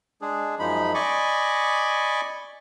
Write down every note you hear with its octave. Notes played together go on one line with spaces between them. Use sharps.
G#3 D4 G#4
F#2 F3 G#3 D#4 B5
D5 D#5 G#5 B5 C#6 D6